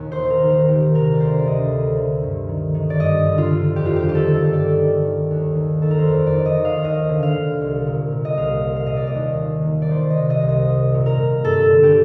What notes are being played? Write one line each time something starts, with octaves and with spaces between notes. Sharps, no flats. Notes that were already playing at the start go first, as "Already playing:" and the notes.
Already playing: D#2 A#2
C5
D#3
A#4
D#3
A#4
D#3 G4
C3 A#4
D5
D2 C5
D5
D2 D#5
D3
D3
G2
D#3
D#3
D5
G2 D#5
D3
F4
D3
F2 G4
F4
G4
D#3
G4
A4
D#3
A4
G2 D5
D#3
D#3
D#2
D#3
D#3 A4
A#4
C5
F2 D5
D5
D#3
D#5
D#3
F5
D#2 D#5
D3
F5
D3
C2
A#2
A#2
D#5
C2 F5
A#2
F5
A#2 D#5
D5
D#5
D#2
D#3
D#3
D5
D#3 C5
D#5
C3
D#5
C2
D#5
C2
A#2
A#4
A#2
G2 A4
D3
G4